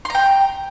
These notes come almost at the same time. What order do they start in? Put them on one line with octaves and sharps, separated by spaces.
C6 A#5 G5